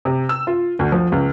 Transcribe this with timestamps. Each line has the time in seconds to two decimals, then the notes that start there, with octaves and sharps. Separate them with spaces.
0.05 C3
0.29 E6
0.47 F4
0.79 D2
0.92 F3
1.12 C#2